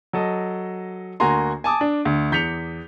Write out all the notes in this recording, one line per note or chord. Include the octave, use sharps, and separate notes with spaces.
F#3 A4 D#5
D2 A#3 F#4 G#5 A#5 C6
G#5 A5 D6 D#6
D4
D2
E2 G6 B6 C#7 F7